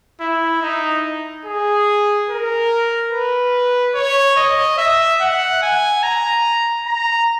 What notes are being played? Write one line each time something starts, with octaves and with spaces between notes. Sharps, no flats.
E4
D#4
G#4
A#4
B4
C#5
D#5
E5
F#5
G#5
A#5
A#5